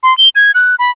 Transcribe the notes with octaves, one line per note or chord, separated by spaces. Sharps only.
C6
G7
G#6
F#6
B5